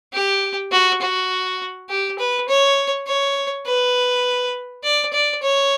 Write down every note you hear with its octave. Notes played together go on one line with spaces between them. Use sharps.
G4
F#4
F#4
G4
B4
C#5
C#5
B4
D5
D5
C#5